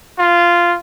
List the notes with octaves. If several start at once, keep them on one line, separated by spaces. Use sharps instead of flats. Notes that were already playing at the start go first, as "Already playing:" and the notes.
F4